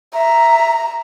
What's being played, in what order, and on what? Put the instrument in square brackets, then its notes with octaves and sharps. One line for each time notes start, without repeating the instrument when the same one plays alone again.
[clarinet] E5 [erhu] A#5